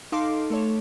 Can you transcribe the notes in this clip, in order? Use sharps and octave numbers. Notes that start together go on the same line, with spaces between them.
D#4 A4 F5 C6 D6
A3 A4 C#5